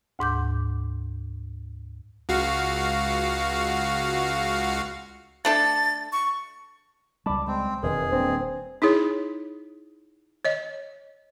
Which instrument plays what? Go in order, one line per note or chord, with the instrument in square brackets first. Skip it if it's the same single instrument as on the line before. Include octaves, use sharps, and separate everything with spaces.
[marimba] D2 G#2 D6 G6
[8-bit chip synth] C#2 F#4 F5
[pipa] A3 D4 A4 [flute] A6
[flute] C#6
[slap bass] C#2 G3 [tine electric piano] A5 B5 D6
[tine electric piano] G#3 [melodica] C4
[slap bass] E1 F2 D#3 [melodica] G#4 [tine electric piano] A#4 B4 D#5
[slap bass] D#1 D4 [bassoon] C4
[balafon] D#4 E4 G#4 C#5
C#5 D#5